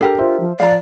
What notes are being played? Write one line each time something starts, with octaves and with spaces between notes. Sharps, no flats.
D4 G4 A4 A#4
F4 C5 E5
F3
F3 D5 F5 A#5